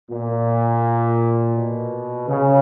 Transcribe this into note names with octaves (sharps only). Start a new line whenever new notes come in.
A#2
B2
C#3